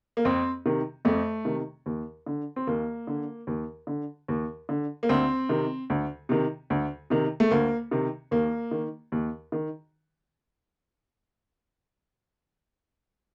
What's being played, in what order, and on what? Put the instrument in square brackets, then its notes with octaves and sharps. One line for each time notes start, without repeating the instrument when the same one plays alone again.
[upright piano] A#3
F2 C4
C3 D#3
F2 A3
C3 D#3
D#2
D3
C4
D#2 A#3
D3
D#2
D3
D#2
D3
A#3
D2 C4
C3 D#3
D2
C3 D#3
D2
C3 D#3
A3
D2 A#3
C3 D#3
D#2 A#3
D#3
D#2
D#3